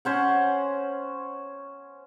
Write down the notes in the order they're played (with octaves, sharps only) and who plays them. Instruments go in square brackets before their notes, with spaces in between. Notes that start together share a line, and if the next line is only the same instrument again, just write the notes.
[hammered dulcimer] C#4 C5 F#5